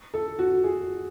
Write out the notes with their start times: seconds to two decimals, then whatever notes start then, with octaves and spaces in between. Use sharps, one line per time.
0.14 A4
0.39 F#4
0.64 G#4